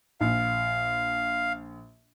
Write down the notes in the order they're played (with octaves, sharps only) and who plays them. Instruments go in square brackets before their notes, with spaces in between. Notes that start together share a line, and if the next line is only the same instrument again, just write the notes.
[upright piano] A#1 [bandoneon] F5